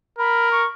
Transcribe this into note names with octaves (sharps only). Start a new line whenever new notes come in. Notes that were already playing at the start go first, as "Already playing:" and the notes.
A#4 B5
C#6